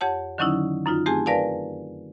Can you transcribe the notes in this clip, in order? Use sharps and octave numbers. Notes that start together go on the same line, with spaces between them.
F2 G4 C#5 F#5 A5
D3 D#3 F#3 C#4 D#4 E4
F#2 D#4 F4
A3 C4 G4 G#4 G#5 A5
A#4 B4 D5 F5 G#5 A5